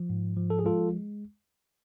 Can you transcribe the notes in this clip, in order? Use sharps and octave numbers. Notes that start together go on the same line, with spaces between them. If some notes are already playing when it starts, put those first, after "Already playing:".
Already playing: F3
G#2
F3
A4
G#4
G#3 F4 A4